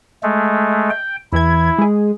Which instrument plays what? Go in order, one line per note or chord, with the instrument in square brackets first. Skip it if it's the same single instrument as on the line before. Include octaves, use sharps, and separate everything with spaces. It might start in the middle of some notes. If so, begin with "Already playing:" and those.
[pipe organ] G#3 A3
G5
[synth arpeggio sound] E2 E3 G#6 [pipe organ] E4
[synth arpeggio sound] G#3 G#4